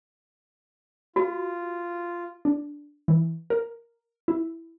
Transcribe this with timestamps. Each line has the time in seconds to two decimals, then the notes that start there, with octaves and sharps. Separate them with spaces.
1.16 F4 F#4
2.45 D4
3.08 E3
3.50 A#4
4.28 E4